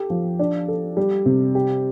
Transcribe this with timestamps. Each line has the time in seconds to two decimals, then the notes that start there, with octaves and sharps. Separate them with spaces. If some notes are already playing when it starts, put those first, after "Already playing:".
Already playing: G4 A4
0.10 F3
0.39 D4
0.68 A4
0.97 G3
1.26 C3
1.55 G4